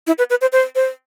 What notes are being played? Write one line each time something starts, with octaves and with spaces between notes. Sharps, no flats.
E4
B4
B4
C5
C5
C5